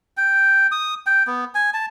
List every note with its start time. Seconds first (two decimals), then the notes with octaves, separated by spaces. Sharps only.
0.17 G5
0.72 D#6
1.06 G5
1.27 B3
1.55 G#5
1.74 A5